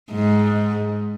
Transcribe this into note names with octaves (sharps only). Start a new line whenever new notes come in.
G#2